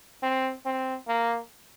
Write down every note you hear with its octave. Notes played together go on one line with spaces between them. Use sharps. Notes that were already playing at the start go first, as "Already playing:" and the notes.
C4
C4
A#3